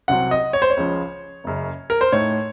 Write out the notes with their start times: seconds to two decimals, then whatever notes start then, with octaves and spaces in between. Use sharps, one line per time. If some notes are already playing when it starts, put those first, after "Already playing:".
0.08 C2 C3 F#3 C4 F#5
0.31 D#5
0.53 C#5
0.62 C5
0.70 C#5
0.77 C#2 C#3 F3
1.44 F#1 F#2 C#3
1.90 A#4
2.01 C5
2.12 A2 A3 D#4 C#5